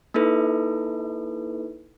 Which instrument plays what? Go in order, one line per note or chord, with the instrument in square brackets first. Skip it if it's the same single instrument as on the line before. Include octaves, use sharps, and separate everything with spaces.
[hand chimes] A#3 D#4 E4 A4 B4